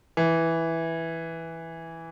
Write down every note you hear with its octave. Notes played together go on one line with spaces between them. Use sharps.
E3